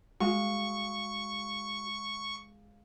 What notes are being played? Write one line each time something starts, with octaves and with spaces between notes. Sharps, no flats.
G#3 F#4 F5 C#6